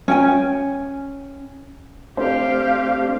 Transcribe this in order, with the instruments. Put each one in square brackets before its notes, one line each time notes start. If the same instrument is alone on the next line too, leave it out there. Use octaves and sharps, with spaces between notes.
[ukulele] C#4 G5 G#5
[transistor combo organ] A3 C4 D4 [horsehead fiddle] G4 F5 [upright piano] C5